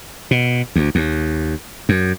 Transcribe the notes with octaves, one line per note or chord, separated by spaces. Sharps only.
B2
D2
D#2
F#2